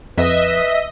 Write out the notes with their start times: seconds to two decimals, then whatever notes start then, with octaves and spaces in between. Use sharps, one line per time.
0.18 F2 B4 D#5 E5